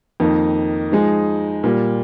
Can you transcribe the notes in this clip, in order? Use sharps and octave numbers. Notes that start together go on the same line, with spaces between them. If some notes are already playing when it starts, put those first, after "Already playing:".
F2 D#3 A#3 D#4
F3 G#3 D#4 G#4
A#2 G3 A#3